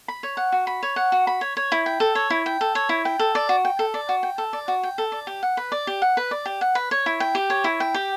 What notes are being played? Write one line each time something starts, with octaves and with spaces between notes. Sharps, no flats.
B5
C#5
F#5
F#4
B5
C#5
F#5
F#4
B5
C#5
C#5
E4
G5
A4
C#5
E4
G5
A4
C#5
E4
G5
A4
D5
F#4
G5
A4
D5
F#4
G5
A4
D5
F#4
G5
A4
D5
G4
F#5
B4
D5
G4
F#5
B4
D5
G4
F#5
B4
C#5
E4
G5
G4
C#5
E4
G5
G4